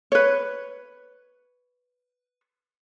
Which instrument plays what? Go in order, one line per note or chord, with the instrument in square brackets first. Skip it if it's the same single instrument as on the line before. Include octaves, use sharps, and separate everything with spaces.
[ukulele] B4 C#5